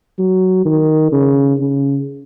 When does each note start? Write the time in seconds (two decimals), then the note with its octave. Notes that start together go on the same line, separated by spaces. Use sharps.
0.19 F#3
0.65 D#3
1.12 C#3
1.59 C#3